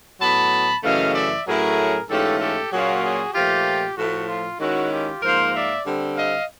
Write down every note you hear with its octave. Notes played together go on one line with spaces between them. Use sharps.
A2 F#3 B3 A5 B5
F#2 C#3 E3 A3 D#5 F5
D5 E5
A2 F#3 A3 C#4 E4 G#4 A#4
G#2 E3 A3 C#4 F4 G4 A4
G4 A4
A#2 F#3 A#3 C#4 F4 F#4 G#4
F#4 G#4
A#2 F3 A3 F4 G4
A2 F3 A3 F#4
F4
D#3 G#3 C#4 E4 F#4
F4 G4
G#2 F3 A#3 A#4 C5
D5 E5
D3 G3 C4
D#5 F5